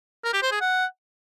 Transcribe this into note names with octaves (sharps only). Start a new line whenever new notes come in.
A#4
G4
C5
G#4
F#5